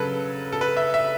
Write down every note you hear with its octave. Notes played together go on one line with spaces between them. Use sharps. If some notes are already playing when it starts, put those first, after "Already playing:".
Already playing: C#3 F#3 A4 B4
A4
B4
E5
E5